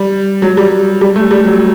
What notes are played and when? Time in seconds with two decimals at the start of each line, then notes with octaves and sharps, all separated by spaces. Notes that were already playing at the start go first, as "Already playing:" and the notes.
Already playing: G3
0.42 F#3
0.57 G3
1.01 G3
1.16 A3
1.31 G3
1.46 F#3